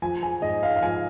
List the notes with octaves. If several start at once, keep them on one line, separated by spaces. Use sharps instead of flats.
F3 G#5
G#5
G#2 D#5
F5
F5
F3 G#5